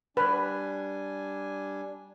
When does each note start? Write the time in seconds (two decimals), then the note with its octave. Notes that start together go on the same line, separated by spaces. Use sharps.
0.17 G3 D4 B4 G#5